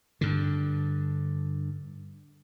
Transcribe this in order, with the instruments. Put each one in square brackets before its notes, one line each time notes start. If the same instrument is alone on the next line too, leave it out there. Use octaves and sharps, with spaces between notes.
[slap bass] G2 D3